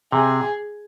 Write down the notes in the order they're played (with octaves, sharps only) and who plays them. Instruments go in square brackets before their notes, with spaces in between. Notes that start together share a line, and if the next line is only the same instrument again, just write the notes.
[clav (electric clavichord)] C3 [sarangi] G#4